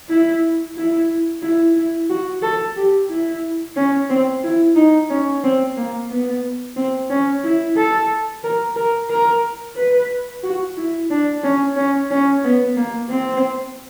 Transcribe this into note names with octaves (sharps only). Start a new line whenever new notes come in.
E4
E4
E4
E4
F#4
A4
G4
E4
C#4
C4
E4
D#4
C#4
C4
A#3
B3
C4
C#4
E4
A4
A#4
A#4
A#4
B4
F#4
E4
D4
C#4
C#4
C#4
B3
A#3
C4